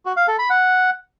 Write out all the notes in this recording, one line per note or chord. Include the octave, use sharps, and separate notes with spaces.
F#4
F5
A4
B5
F#5